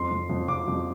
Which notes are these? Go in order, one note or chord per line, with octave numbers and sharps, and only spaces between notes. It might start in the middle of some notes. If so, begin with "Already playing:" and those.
Already playing: F2 C6
F2
F2
F2 D6
F2